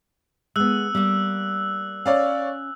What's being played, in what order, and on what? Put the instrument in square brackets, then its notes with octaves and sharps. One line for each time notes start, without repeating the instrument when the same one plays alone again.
[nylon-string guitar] G#3 B3 [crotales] E6 F#6
[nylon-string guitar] G3 A#3
[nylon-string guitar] C#4 [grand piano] C#5 D5 F5